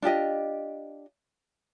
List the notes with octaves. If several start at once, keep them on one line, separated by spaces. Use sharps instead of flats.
D4 F4 G4 D#5